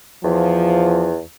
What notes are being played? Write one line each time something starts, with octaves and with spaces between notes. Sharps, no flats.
E2 F3